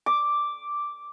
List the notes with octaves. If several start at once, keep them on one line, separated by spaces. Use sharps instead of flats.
D6